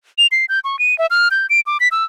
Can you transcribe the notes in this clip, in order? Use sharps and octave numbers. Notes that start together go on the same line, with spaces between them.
F7
C7
G6
C#6
D#7
E5
F6
G6
D7
D6
B6
E6